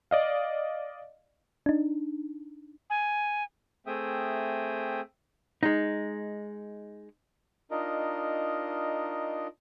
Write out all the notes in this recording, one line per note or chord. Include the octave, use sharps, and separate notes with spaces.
D5 D#5 F5
D4 D#4
G#5
A3 C4 G#4 E5 G5 D#6
G#3 D#4
D4 D#4 F4 A#4 D#5